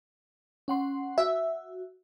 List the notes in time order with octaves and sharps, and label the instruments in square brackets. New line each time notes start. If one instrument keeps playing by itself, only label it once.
[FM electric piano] C#4 F#5 C6
[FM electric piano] F#4 [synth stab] E5